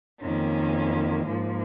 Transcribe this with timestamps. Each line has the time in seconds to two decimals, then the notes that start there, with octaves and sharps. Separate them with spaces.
0.20 F2 D#3 A#3 C#4
1.26 G#2 F3 A#3